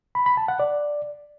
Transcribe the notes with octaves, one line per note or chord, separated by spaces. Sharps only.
B5
B5
A5
F#5
D5